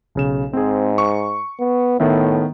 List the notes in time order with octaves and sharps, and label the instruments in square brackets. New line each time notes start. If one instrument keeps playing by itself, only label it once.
[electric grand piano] B1 C#3 E7
[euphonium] G#2 [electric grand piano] C4 G#4
[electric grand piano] C#6
[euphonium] B3
[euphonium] A2 [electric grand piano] D#3 B3 E5